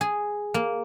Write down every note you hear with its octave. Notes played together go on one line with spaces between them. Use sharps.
G#4
A#3